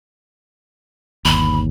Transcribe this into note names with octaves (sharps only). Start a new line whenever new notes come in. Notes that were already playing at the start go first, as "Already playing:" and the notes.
G1 D#2 B5